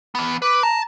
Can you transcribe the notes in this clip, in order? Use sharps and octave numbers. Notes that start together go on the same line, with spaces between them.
E3 B3
B4 D6
A5 A#5